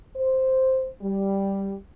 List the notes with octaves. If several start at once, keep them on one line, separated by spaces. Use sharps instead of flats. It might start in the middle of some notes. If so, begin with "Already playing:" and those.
C5
G3